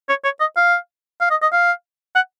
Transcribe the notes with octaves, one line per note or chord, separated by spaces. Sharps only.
C#5
C#5
D#5
F5
F5
D#5
D#5
F5
F#5